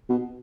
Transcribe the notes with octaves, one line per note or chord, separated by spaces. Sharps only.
B2